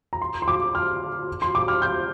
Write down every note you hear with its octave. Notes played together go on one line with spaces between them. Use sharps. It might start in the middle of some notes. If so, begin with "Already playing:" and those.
A#5
C6
C6
D6
F6
C6
D6
F6
G6